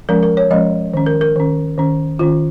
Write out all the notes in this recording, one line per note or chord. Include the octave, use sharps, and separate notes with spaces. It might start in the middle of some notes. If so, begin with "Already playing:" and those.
F3 G#3 C#4 A#4
A#4
C#5
F3 G#3 C#4 D#5
D#3 C#4
A#4
A#4
D#3 C#4
D#3 C#4
D#3 C#4 F4